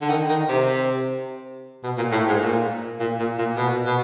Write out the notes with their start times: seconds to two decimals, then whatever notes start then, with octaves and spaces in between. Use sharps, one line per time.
0.02 D3
0.10 D#3
0.29 D#3
0.49 C3
1.84 B2
1.98 A#2
2.12 A2
2.28 G#2
2.42 A#2
3.00 A#2
3.19 A#2
3.39 A#2
3.57 B2
3.86 B2